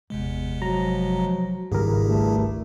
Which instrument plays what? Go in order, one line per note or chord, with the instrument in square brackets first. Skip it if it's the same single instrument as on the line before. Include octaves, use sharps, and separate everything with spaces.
[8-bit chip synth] G1 C3 G#3 [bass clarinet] E2
[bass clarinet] F3 [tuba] F#3 [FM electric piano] A#5
[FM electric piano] G#1 C#2 A#4 [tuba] G2 [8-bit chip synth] E4 G4 G#4
[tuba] G2 [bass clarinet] A3